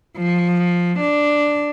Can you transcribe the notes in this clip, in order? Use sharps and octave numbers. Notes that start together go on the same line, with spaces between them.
F3
D4